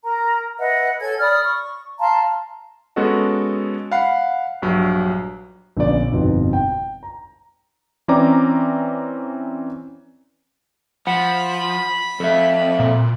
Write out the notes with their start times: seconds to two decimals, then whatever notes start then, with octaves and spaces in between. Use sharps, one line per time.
0.04 A#4 A#5
0.59 B4 D#5 E5 F#5
1.00 A4 C#5 G#5 G#6
1.20 D5 B5 D#6 F6
1.45 C#6
1.99 F5 A5 A#5 C6
2.96 G#3 B3 C#4 F#4 A4 D#5
3.91 F5 F#5 B5 C7
4.62 A#1 G2 F#3
5.77 A#1 D3 B3 C#4 D5
6.11 G1 F2 G#2 B2
6.53 G5
7.03 A#5
8.08 E3 C4 C#4 D5 A#5 D6
11.07 F3 F#5 B5
12.20 F2 A4 E5
12.79 A#2